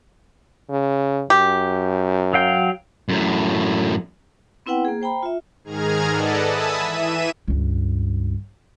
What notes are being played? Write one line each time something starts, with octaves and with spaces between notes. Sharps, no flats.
C#3
F#2 G4
F#3 F5 G5
F#2 A2
B3 C4 E4 B4 F#5 G5
A#3 G#4
C5 G5 A#5 B5
F4 E5
G#2 D#3 G#4 A#5 F6 G#6
A4 B4 D5 D#5 F#5 A5
E5 G#5 A5 B5 D#6 E6
E3 E5 D#7 E7
C#2 G2